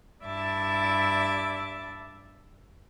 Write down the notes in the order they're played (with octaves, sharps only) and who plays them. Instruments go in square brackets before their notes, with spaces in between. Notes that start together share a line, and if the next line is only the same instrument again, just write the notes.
[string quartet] G2 E4 D5 E5 A5 D6